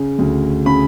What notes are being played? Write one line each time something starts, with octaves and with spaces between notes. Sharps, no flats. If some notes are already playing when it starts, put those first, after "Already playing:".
Already playing: C#3
D2
C#3 B5